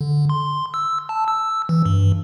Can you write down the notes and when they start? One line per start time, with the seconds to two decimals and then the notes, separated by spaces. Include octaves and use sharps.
0.01 D3
0.30 C6
0.74 E6
1.09 A5
1.28 E6
1.69 E3
1.86 G2